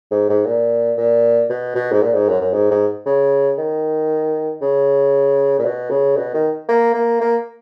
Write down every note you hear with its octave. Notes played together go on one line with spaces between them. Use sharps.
G#2
G#2
A#2
A#2
B2
B2
G#2
A#2
G#2
F#2
F#2
G#2
G#2
C#3
D#3
C#3
A#2
B2
C#3
B2
D#3
A#3
A#3
A#3